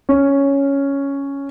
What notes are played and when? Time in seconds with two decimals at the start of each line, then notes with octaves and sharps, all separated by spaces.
0.09 C#4